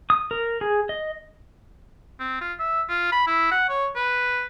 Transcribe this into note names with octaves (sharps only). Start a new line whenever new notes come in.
D#6
A#4
G#4
D#5
C4
F4
E5
F4
B5
E4
F#5
C#5
B4